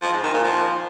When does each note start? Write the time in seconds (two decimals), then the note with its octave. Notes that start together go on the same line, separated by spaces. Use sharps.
0.02 F3
0.13 G#2
0.23 D#3
0.34 A#2
0.44 F3